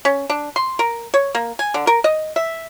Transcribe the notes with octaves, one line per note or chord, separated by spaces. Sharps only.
C#4
D4
C6
A#4
C#5
A#3
G#5
D3
A#4
D#5
E5